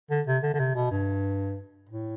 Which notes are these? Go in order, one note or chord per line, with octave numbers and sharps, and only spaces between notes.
D3
C3
D3
D3
C3
B2
G2
A2